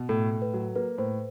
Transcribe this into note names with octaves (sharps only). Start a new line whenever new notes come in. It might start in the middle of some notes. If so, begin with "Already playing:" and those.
Already playing: B2
A2 A4
A2
B4
F#3
A#3 B4
A2 C5